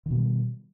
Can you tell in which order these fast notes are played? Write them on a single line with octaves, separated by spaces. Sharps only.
D#3 B2 G3